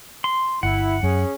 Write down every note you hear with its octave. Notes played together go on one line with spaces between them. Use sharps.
C6
G1 E4 F#5
F#2 C#4 G#4